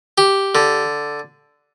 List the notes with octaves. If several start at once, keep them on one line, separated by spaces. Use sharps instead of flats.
G4
D3